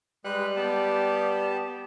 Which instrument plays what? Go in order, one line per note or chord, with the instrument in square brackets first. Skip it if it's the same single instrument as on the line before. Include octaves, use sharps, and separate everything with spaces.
[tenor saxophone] G3 [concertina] G#3 B4 F#6
[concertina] B3 G4 A5